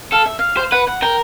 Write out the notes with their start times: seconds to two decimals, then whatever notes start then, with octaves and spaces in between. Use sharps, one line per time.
0.12 A4 F5
0.26 E5
0.39 F5
0.57 C5
0.72 B4 F#5
0.87 F#5
1.02 A#4 G5